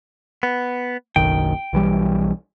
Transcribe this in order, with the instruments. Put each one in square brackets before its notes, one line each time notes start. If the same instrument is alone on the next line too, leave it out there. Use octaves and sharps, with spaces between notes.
[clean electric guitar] B3
[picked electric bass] F#1 B1 D#3 [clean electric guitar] G5
[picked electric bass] B1 E3 G3